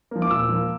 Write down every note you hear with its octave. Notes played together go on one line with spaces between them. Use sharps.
F3 A#3
D6
A#2 E6
F3 A#3